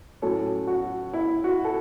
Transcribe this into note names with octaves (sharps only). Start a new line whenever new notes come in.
A2 F#3 C#4 A4
F#4
E4
F#4
A4